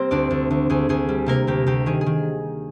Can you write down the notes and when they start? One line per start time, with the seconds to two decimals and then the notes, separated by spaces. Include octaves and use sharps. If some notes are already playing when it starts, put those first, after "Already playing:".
Already playing: G3 A#3 C4 A#4 C5
0.11 D2 D4 D5
0.31 D2
0.51 D2
0.70 D2 G#4
0.89 D2 G#4
1.09 G3
1.26 C3 A#3 A#4
1.47 D2 G4
1.67 D2 G4
1.86 D#3 G#4
2.01 G#4
2.06 D#3